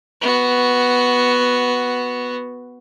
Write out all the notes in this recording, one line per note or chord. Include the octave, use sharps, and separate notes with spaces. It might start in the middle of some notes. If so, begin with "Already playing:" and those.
B3 F#4